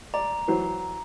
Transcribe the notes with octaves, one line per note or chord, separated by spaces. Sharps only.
D5 A#5
E3 F#3 C5